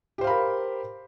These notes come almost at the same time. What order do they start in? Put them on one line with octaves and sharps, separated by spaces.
G4 C5 F5 B5 A#4